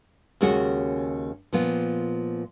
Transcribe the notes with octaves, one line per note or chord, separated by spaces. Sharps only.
D#2 C#3 G#3 C#4 F#4
A#2 F3 B3 F4